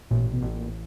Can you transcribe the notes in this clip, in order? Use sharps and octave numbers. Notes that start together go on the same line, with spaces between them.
A1 A#2
B2
A1
A#2